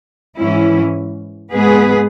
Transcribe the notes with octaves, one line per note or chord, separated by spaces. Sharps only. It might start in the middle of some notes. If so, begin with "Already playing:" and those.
G#2 E3 C#4 E4
G#2 G#3 B3 G#4 B4